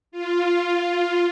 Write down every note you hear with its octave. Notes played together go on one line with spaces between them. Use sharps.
F4